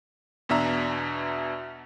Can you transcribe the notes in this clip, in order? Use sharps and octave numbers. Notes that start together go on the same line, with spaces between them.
E2 B2 D4 E5 A#5